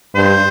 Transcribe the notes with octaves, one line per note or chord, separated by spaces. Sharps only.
G2 C5